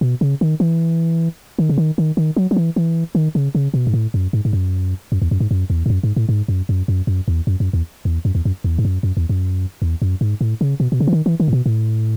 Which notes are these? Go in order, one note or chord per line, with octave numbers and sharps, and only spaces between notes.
B2
C#3
D#3
E3
D#3
C#3
D#3
D#3
D#3
F#3
F#3
E3
E3
D#3
C#3
C#3
B2
G#2
A2
F#2
G#2
G#2
F#2
F#2
E2
F#2
G#2
F#2
E2
G#2
F#2
G#2
A2
G#2
F#2
F#2
F#2
F#2
E2
F#2
F#2
E2
E2
F#2
E2
F#2
E2
G#2
F#2
F#2
E2
F#2
E2
F#2
G#2
A2
C#3
B2
B2
C#3
E3
D#3
E3
D#3
A2
B2
A2